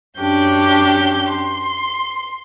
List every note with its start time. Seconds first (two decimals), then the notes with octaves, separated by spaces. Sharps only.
0.19 F#2 C#4 D4 G4 G6
1.30 C6